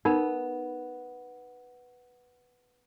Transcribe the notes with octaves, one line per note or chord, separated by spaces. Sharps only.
B3 D#4 A#4 B5